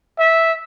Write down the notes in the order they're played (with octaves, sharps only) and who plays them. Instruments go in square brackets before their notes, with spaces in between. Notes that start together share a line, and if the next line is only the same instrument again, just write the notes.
[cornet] E5